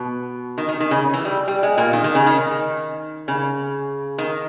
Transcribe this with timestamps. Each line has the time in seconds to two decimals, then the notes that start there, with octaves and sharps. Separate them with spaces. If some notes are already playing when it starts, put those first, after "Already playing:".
Already playing: B2 B3
0.58 D#3
0.69 D#3
0.80 D#3
0.91 C#3
1.14 E3
1.25 G3
1.48 G3
1.63 G#3
1.77 A#2 A#3
1.93 D#3
2.04 D#3
2.15 C#3
2.26 D#3
3.28 C#3
4.18 D#3